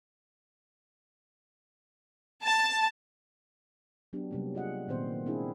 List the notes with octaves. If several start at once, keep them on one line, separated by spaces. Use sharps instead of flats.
A5
F#3 B3 D4 G4
C3 F#3 G3 A#3 C#4
F4 G#4 D#5 F#5
A#2 D#3 B3 C4 C5
C4 D4 E4 G#4